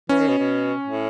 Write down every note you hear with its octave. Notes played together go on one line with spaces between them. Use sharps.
E3 C#4
D#3
B2
B2
A2